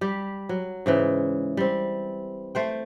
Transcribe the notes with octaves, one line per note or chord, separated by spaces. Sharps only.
G3 G4
F#3
G#2 C#3 E3
G3 C4
A3 C5 G5